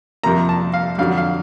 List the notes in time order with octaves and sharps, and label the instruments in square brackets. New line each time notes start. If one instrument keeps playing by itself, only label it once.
[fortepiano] F2 C3 F3 A#3 A#5
A5
F5
F2 D3 F#3 F5
F5